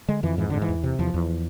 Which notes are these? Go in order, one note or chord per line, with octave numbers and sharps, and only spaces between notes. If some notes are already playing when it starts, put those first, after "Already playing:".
D3 G#3
F2 E3
G#2 E3
G#2 D3
E3
E2
C3
E2 F3
E2